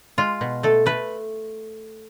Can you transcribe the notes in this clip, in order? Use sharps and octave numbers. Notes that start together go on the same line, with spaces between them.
G#3 F4
B2
A3 A4
A3 B4